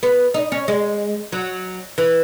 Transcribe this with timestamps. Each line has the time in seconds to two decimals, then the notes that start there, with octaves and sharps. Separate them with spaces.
0.03 B3
0.34 D#4
0.52 C#4
0.68 G#3
1.32 F#3
1.98 E3